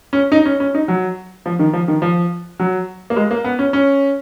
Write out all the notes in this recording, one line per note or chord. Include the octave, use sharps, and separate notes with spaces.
C#4
D#4
C#4
C#4
D#4
F#3
F3
D#3
F3
D#3
F3
F#3
A#3
G#3
A#3
B3
C#4
C#4